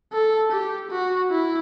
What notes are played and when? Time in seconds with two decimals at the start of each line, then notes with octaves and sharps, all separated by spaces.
0.13 A4
0.51 G4
0.91 F#4
1.31 E4